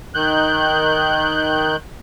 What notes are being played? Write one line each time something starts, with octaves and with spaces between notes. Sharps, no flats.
D#3 F#6 G6